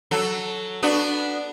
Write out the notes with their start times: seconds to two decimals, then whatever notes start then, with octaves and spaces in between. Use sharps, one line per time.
0.11 F#3 A4
0.83 B3 D4 F#4